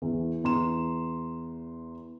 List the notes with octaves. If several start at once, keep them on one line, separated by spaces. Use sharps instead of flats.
E2
E2 A#5 C6 E7